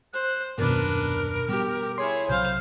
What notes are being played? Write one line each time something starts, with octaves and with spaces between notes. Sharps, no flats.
C5 F#6
D#1 F#2 B2 D#3 D4 A#4 B4
B2 G3 B3 G4
E4 G#4 C#5 C6
B1 C3 F#3 C5 F5 G6